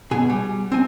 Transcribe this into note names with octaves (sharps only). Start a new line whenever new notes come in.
B2 G#4 G#5
G3
C4 G#5